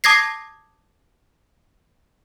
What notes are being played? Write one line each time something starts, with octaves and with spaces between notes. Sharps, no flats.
A5 D6 D#6 G#6 A#6 C7